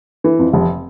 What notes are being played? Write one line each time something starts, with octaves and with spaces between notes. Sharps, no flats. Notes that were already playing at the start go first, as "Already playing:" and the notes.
E3
F2
F1